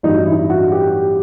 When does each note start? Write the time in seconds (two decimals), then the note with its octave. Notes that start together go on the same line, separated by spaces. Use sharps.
0.03 A1 G2 F#3 D#4
0.26 E4
0.50 F#4
0.72 G4